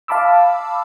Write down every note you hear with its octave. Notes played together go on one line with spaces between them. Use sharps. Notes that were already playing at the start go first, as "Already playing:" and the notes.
F5 A5 B5 D6 E6